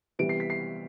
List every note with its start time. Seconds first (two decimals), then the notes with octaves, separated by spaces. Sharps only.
0.19 C3 E3 G3 B3 D7
0.29 C7
0.40 B6
0.50 C7